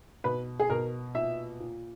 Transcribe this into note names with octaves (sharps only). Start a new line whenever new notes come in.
B2 B4
G#4
B2 A#4
A#2 E5
A#2